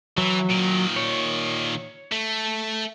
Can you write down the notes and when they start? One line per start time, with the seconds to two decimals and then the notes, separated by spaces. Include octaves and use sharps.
0.18 E3 F#3
0.50 A#2 D#3
0.96 C#5
2.12 A3